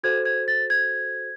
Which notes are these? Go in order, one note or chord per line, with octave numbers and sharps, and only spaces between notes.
F#4 A4 C5 G#6
G#6
A6
G#6